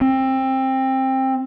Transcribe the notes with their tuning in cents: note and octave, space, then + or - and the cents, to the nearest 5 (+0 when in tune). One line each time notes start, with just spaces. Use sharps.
C4 +20